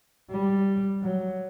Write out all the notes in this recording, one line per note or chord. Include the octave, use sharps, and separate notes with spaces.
G3
F#3